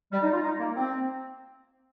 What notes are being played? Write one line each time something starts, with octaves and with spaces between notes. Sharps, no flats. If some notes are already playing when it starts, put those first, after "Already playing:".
G3
D#4
F4
D#4
A#3
C4